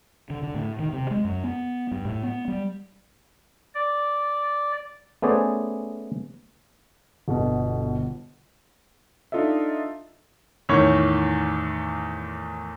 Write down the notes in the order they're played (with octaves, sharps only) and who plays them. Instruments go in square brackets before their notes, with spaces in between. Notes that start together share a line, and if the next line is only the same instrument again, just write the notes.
[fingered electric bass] D3
D3
A2
D#3
C3
G#3
F#2
B3
G2
A2
B3
G3
[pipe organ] D5
[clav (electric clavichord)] A3 B3 C#4 G#4 C5 D5
[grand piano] G1 B2 D3
[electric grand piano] D4 D#4 F4 A4 D#5 E5
[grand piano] E2 A2 D#3 C#5